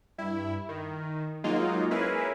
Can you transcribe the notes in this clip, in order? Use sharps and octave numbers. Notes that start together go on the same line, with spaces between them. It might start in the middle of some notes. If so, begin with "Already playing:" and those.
G2 E4
D#3
F#3 G#3 A#3 D#4 F4
C#4 E4 G#4 A#4 B4